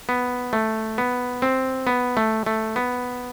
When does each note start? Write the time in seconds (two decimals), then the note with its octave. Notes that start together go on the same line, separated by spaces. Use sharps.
0.09 B3
0.53 A3
0.98 B3
1.42 C4
1.87 B3
2.17 A3
2.46 A3
2.76 B3